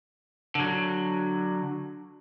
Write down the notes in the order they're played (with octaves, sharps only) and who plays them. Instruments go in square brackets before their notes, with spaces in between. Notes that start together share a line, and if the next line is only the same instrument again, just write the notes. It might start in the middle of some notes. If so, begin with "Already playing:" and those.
[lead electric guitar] D3 F#3